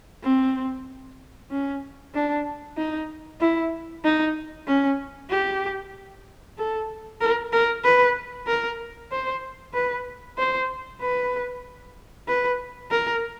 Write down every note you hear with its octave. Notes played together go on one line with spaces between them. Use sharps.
C4
C#4
D4
D#4
E4
D#4
C#4
G4
A4
A#4
A#4
B4
A#4
C5
B4
C5
B4
B4
A#4